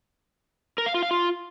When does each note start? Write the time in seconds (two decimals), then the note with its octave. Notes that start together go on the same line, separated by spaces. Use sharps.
0.78 A#4
0.86 F5
0.94 F4
1.03 F5
1.11 F4